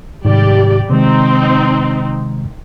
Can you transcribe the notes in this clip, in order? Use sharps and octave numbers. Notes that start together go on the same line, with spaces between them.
G#2 C3 D#3 G3 G4 D5
C3 D#3 G#3 C4 D#4